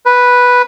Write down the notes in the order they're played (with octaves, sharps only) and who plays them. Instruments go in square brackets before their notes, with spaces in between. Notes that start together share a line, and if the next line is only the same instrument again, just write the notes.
[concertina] B4